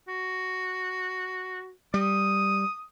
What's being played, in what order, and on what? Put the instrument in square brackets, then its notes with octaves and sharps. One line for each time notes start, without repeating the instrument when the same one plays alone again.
[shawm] F#4
[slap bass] G3 [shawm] D#6